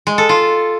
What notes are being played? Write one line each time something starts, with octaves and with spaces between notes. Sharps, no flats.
G#3
A4
F4